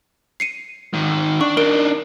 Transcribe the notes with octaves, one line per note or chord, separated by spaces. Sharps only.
C7 C#7 D#7
G#2 D#3
D4 C#6
D4 D#4 A#4 D7